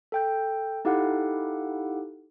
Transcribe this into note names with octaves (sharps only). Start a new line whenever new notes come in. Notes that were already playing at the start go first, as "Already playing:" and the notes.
A4 G5 G6
D#4 E4 G4 A4 F5 F#5